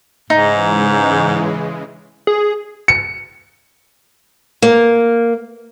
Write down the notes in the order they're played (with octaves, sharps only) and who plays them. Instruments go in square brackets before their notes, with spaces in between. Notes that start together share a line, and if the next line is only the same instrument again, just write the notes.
[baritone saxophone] G#2 [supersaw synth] C#3 E3 G#3 [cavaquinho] D#4
[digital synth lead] G#4
[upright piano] C#7
[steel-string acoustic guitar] A#3